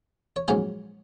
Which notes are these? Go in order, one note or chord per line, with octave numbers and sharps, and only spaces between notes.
C#5
A#1 G#2 F#3 C#4 G#4 C5